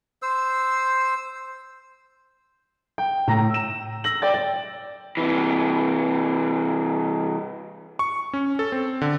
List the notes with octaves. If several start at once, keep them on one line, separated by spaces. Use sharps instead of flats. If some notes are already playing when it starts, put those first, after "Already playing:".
C5 E6
G5
A2 A#5 A#6
E6 E7
E6 A#6 F#7
D5 G5 A6
D5
C3 E3
C#6
C#4
A4
C4
D3